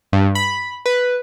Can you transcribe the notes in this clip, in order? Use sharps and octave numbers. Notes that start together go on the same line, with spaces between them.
G2
B5
B4